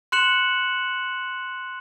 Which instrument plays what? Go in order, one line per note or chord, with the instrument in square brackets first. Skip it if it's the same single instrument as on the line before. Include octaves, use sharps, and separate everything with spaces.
[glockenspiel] C6 F#6 C#7 E7 F#7